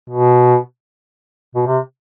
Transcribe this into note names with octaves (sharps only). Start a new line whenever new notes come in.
B2
B2
C3